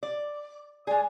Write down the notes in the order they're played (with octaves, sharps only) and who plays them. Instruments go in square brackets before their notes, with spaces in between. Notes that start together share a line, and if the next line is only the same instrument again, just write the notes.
[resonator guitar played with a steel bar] D5
[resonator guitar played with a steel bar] G#3 G#4 [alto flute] D5